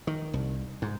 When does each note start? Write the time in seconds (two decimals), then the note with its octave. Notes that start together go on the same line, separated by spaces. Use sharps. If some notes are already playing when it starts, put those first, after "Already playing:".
0.07 D#3
0.33 C2
0.82 G#2